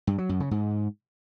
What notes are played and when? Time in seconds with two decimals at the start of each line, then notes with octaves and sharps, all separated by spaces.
0.07 G2
0.18 F#3
0.29 F#2
0.40 C#3
0.51 G#2